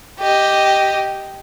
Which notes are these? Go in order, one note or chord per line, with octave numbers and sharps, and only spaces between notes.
G4 D#5